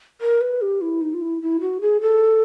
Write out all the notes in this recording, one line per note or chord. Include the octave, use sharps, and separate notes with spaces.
A#4
B4
G4
E4
D#4
F4
E4
E4
F#4
G#4
A4